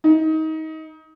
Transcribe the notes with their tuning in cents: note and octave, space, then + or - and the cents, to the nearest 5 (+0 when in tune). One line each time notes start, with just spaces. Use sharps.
D#4 +25